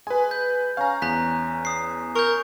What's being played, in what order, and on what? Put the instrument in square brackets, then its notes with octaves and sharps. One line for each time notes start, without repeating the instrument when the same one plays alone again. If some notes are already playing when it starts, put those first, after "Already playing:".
[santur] G#3 [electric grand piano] B4 G#5
[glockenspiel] G6
[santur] C#4 [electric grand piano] F5 A#5
[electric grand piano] E2 [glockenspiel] A#5 F#6 B6
[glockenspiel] D#6 C7
[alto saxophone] A#4 [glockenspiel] C#6 G6